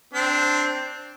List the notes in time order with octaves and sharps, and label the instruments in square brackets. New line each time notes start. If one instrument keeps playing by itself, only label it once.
[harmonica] C4 D4